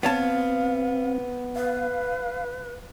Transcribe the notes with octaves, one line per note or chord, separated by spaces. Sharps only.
B3 C4 C#5 F5 A5
B4 F5